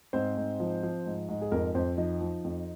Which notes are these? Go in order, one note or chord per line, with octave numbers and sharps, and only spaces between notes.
G#2 C4 C5
G#2
F3
F3
G#2
G#2
G#4
F2 A#4
F2 C4 C5
F3 D#4 D#5
F3
F2